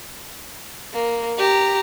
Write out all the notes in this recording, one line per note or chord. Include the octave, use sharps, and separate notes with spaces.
A#3
G4 A#5